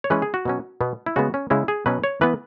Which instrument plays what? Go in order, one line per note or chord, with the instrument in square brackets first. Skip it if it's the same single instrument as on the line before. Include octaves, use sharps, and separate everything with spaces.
[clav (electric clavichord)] C#5
E3 G#3 C#4 B4
G#4
F#4
B2 F#3 C#4
B2 B3
E4
C#3 G#3 B3 F#4
C#4
C#3 G#3 C#4 E4
G#4
B2 F#3 C#4 B4
C#5
E3 B3 B4